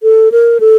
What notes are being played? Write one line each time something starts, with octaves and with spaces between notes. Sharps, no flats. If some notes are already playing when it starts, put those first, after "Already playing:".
A4
A#4
A4